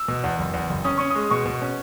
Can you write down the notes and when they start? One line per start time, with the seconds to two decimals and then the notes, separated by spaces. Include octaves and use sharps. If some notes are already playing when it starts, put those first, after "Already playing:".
Already playing: E6
0.08 B2
0.24 E2
0.39 F#1
0.54 E2
0.70 F#1
0.84 C#4 D#6
0.98 C#4 C#6
1.10 G#3 D#6
1.31 B2 C#6
1.46 B2
1.62 C#4